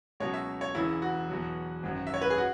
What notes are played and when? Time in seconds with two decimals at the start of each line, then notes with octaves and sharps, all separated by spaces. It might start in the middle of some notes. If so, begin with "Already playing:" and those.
0.20 C#2 B2 F#3 C#5
0.34 E5
0.61 C#5
0.75 E1 E2 C#3 E4
1.02 F#4
1.29 E2 B2 F#3
1.83 G#1 F#2 F#3
2.07 E5
2.14 C#5
2.21 B4
2.30 G#4
2.38 F#4